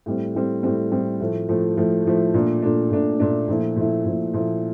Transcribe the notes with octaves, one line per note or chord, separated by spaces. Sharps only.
A2 G3 C4
A2 G3 C4
A2 G3 C4
A2 G3 C4
A2 F3 A3
A2 F3 A3
A2 F3 A3
A2 F3 A3
A#2 A3 D4
A#2 A3 D4
A#2 A3 D4
A#2 A3 D4
A#2 F3 A3 E4
A#2 F3 A3 E4
A#2 F3 A3 E4
A#2 F3 A3 E4